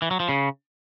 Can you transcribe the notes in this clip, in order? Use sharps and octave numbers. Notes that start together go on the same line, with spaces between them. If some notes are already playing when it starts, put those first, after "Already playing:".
E3
F#3
F3
C#3